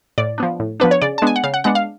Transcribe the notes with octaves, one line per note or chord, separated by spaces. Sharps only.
A2 D5
F3 B3 D4
A2
F3 B3 D4 B4
C#5
C#3 D5
A5
G#3 B3 D4 G#5
F#5
C#3 F5
F#5
G#3 B3 D4 F#5
F5